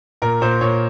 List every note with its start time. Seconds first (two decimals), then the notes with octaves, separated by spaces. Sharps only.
0.22 A#2 A#4
0.41 A#2 C5
0.61 A#2 C#5